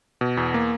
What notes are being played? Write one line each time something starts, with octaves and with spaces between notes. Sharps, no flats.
B2
E2
A#3